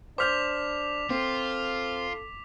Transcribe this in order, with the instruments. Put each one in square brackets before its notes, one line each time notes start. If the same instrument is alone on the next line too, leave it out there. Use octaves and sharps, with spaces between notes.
[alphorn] D4 [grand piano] C5 F6 G6 [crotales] D6 B6 F7
[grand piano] C4 [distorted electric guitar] F4 [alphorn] A4